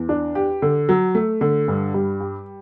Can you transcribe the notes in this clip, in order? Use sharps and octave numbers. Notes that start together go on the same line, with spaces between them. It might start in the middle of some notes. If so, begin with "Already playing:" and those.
Already playing: E2
D4
G4
D3
F#3
A3
D3
G2
G3
G4